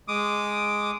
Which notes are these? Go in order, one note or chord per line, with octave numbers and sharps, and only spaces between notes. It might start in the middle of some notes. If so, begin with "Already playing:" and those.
G#3 D6 D#6